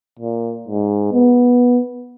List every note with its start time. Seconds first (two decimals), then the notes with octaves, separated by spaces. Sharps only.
0.19 A#2
0.68 G#2
1.13 B3